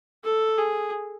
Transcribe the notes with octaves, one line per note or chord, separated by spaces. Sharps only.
A4
G#4